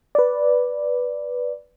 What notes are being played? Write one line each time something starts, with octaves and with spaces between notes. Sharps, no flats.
B4 D5